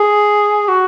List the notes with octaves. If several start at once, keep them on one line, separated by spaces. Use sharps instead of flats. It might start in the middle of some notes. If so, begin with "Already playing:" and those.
Already playing: G#4
F#4